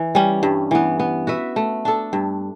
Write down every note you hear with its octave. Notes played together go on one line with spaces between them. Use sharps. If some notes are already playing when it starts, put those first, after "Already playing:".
Already playing: E3
G3 C#4
G2
E3 B3
B3
F#4 B4 E5
A3
D4 A4
G2